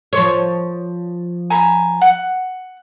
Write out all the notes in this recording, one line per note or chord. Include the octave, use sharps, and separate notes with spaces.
F3 C#5
G#5 A#5 B5
F#5